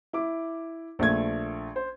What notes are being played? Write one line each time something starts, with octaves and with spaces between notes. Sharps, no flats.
E4 D6
A#1 A3 G#6
C5